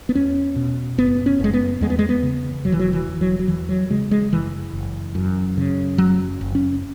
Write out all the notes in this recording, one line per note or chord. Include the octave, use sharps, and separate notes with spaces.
B3
E2 C#4
B2
F#1 B3
C#4
F#1 G#3
B3
E2 G#3
B3
G#3
B3
C#3
E1 F#3
E3
F#3
E3
E1
F#3
F#3
E2 E3
F#3
C#3 G#3
G#3
F#1 E3
F#1
F#2
C#3
F#1 F#3
F#1
C#4